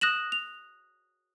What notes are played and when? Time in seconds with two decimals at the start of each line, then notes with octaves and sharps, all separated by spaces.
0.01 D#6 F#6 A#6 E7 F#7
0.32 F7